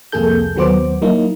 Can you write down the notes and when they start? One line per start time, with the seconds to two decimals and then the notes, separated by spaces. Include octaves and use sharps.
0.12 C2 F2 A#3 G#4 A4 G6
0.56 D#2 F#3 B3 F#4 C5 D6
1.02 F#3 A#3 D#4 E4